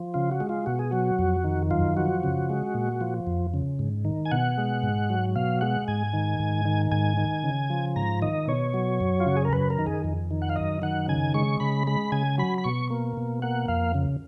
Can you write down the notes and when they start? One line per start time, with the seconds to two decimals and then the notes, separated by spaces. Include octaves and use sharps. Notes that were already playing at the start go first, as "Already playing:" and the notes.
Already playing: F3
0.14 C#3 F4
0.31 F#4
0.40 G#3
0.49 F4
0.66 B2 F#4
0.79 G#4
0.91 F#3 F#4
1.19 F2
1.44 D#3
1.71 F#2 F4
1.97 F3 F#4
2.23 C#3
2.50 G#3
2.75 A#2
3.01 F3
3.27 F2
3.54 C#3
3.79 G#2
4.05 D#3
4.25 G#5
4.32 B2 F#5
4.58 G#3
4.83 G#2
5.10 F#3
5.36 B2 F5
5.61 G#3 F#5
5.88 G#2 G#5
6.13 D#3
6.40 G#2
6.65 D#3
6.92 G#2 G#5
7.17 D#3
7.44 C#3
7.70 F3
7.96 G#2 A#5
8.22 D#3 D#5
8.47 B2 C#5
8.74 F#3
9.00 F#2
9.20 F4
9.26 C#3 F#4
9.37 G#4
9.45 A#4
9.53 F#2 B4
9.70 A#4
9.79 D#3
9.86 G#4
10.04 F2
10.31 D#3
10.42 F#5
10.49 F5
10.56 F#2 D#5
10.82 D#3 F#5
11.08 C#3 G#5
11.34 G#3 C#6
11.60 C#3 B5
11.87 G#3 B5
12.12 C#3 G#5
12.38 F#3 B5
12.58 B5
12.64 B2 C#6
12.90 A#3
13.17 B2
13.42 A#3 F#5
13.68 F2 F5
13.94 C#3